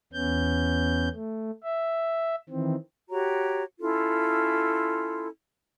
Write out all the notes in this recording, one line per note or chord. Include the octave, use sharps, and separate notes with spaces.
E2 B3 C#4 G6
A3
E5
D#3 E3 C4
F#4 G4 C#5 A#5
C#4 E4 F4 A4